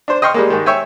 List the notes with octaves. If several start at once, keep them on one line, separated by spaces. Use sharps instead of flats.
D4 C5
D#5 G5 C6 C#6 F6
G3 G#3 A#3
G#2 D#3
C#5 E5 G5 G#5